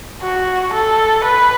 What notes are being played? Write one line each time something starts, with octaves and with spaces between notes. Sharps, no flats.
F#4
A4
B4